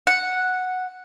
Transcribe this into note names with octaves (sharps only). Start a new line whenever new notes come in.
F#5